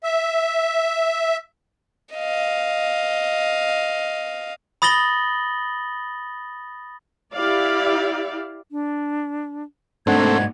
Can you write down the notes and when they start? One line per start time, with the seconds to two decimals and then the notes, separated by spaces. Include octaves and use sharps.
0.04 E5
2.14 D#5 F5
4.82 B5 D#6 A6 A#6 F#7 G7
7.34 E4 G4 D5 F5
8.72 D4
10.07 G#2 A3 A#3 C4 D4 F#5 G#6